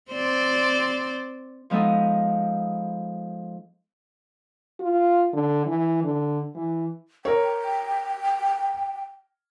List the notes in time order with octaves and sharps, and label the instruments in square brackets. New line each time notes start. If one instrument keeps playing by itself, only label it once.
[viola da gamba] C4 C5 D5
[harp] F3 G#3 B3 D#4 A4 D#5
[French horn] F4
D3
E3
D3
E3
[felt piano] A#4 C#5 [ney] G5